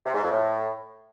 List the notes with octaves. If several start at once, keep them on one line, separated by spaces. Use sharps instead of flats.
C3
G#2
F2
A2